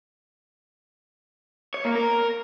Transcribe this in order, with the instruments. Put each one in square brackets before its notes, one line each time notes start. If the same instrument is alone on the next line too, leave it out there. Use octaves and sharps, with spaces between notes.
[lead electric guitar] C#5
A#3
A#4